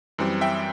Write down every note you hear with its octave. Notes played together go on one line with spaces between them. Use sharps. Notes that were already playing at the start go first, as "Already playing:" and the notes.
F#2 E3 G3 C4
E5 G5